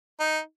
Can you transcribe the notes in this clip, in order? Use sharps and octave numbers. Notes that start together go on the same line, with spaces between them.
D#4